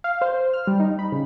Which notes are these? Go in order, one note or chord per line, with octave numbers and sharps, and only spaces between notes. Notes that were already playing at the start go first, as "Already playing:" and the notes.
F5
C5
F6
G3
D#4
B5
C#3